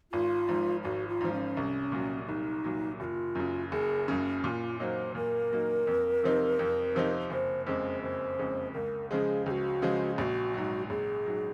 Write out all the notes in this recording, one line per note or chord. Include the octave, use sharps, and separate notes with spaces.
G#1 F4
G#2 F3
G#1 F#4
F4
G#2 F3
C#4
C2
A#2 F#3
C2 D#4
A#2 F#3
F#1 F4 F#4
F#2 C#3
F#1 G#4
F#2 C#3
A#2 F#4
F4
F#3 A#3 D#4 C5 C#5
A#2 A#4
F#3 A#3 D#4
F2
C3 F3 C4 D#4
F2
C3 F3 C4 D#4
F#1 C5
F2 C#3 G#3 C5
F#1 C5
F2 C#3 G#3
C#2 A#4
C#3 F3 G#3 G#4
C#2 F#4 G#4
C#3 F3 G#3
A#1 F#4 G#4
G#2 F#3
A#1 G#4
G#2 F#3